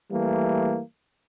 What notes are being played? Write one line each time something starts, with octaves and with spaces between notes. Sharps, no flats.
E3 G3 A3 A#3